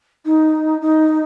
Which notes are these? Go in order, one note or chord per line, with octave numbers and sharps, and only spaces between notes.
D#4
D#4